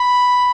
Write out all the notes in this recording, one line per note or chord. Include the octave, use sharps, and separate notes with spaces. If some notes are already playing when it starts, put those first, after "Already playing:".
Already playing: B5